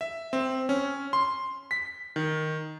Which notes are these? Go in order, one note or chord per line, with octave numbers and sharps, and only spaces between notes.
E5
C4
C#4
C6
B6
D#3